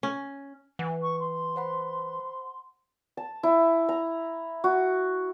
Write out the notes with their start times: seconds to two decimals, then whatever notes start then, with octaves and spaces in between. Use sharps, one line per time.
0.03 C#4
0.79 E3 F#5
1.02 C#6
1.20 C6
1.56 C5 F#5 B5
3.17 A5
3.43 E4
3.89 A#5
4.64 F#4